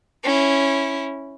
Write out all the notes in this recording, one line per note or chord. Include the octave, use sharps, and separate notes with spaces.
C#4 E4